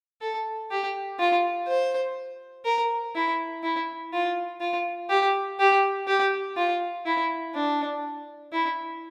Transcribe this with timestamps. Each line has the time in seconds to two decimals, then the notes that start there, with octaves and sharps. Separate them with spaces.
0.21 A4
0.71 G4
1.19 F4
1.67 C5
2.65 A#4
3.15 E4
3.63 E4
4.13 F4
4.61 F4
5.10 G4
5.59 G4
6.07 G4
6.56 F4
7.06 E4
7.55 D4
8.52 E4